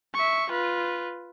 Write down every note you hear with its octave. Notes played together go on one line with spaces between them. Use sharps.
E5 C#6
F4 B4